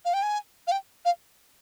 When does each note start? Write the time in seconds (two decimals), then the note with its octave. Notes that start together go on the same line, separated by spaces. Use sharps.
0.05 F5
0.14 G5
0.23 G#5
0.67 F5
0.72 G5
1.05 F5